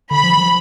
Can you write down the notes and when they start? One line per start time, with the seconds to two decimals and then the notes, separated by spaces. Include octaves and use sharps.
0.11 D3 B5
0.24 F3
0.37 F3